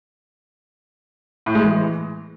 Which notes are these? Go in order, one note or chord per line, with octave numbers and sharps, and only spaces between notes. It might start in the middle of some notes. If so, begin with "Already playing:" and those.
A2
G#3
E3